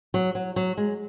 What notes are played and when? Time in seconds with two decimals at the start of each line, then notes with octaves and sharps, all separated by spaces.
0.14 F#3
0.35 F#3
0.56 F#3
0.77 G#3